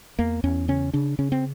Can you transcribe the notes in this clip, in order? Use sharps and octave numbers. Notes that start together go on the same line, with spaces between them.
E2 A#3
E2 C#4
C#3 C#4
C#3 D4
C#3 C#4
C4